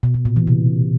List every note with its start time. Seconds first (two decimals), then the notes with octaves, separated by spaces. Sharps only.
0.03 B2
0.14 B2
0.25 A#2
0.36 E3
0.47 C3